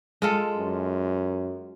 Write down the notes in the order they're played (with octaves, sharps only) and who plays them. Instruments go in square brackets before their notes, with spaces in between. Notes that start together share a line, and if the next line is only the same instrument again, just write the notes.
[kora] G#3 F4 A4
[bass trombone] F#2